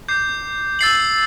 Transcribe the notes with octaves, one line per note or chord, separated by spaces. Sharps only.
D6 G6 C7
E6 A6 C7 F#7